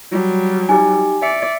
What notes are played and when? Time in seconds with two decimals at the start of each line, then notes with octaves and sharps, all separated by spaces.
0.12 F#3 G3
0.69 D#4 G4 G#5
1.22 D5 E5 C#7